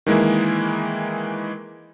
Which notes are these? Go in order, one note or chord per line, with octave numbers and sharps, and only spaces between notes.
D#3 E3 G#3 A#3 E4